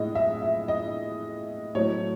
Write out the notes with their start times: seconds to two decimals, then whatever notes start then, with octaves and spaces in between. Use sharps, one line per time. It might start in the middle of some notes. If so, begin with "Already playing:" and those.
Already playing: A2 G#3 D#5
0.15 E5
0.42 E5
0.68 D#5
1.75 A2 F#3 A3 C#5